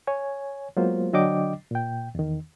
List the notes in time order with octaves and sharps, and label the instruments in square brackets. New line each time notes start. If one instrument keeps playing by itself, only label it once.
[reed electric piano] C#5 G#5
F#3 G#3 A#3 B3 F4 C5
D3 F#3 D4 D#5 G5 D6
A#2 G5
E2 D#3